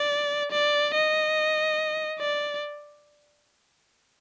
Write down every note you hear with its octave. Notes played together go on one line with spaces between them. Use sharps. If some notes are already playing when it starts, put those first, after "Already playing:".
Already playing: D5
D5
D#5
D5